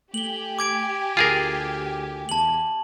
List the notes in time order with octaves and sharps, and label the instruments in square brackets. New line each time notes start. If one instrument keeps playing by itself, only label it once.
[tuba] A3 [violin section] G4 G#5 [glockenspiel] F#7 G7
[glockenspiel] D6 G#6 D7
[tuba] D2 [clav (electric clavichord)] F4 G#4 A#4
[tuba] E2 [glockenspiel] A5 F#7